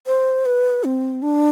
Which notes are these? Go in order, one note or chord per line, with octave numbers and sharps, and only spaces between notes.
C5
B4
C4
D4